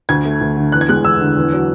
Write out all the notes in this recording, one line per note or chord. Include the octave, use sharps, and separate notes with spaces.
D2 G#6
A3
D2
D3
E2 F#6
G#6
G#3 F#6
E2 E6
D3
E2
F#3